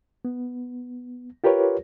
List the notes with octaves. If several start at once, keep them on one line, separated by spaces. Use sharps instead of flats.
B3
F4 G4 A#4 B4 C#5